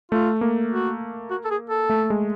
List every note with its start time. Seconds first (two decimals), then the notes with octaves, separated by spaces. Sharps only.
0.12 A3 F4
0.41 A#3
0.72 F#4
1.30 F#4
1.45 A4
1.51 G#4
1.70 A4
1.90 A3
2.10 G#3